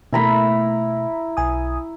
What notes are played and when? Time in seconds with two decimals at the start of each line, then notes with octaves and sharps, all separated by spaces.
0.13 B2 A3 E4 A#5 B5
1.37 B1 G#5 D#6